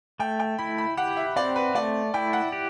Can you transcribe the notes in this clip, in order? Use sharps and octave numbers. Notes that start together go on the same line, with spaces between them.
A3 G5
G5
E4 B5
B5
G4 F#5
E5
C4 D5
B4
A3 D5
E4 G5
F#5
G4